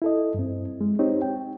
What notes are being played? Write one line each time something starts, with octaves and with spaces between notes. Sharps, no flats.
E4 A4 D#5
G2 C4
G#3
C4 D#4 G4 C#5
G5